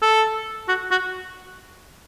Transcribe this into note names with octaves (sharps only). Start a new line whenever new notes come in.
A4
F#4
F#4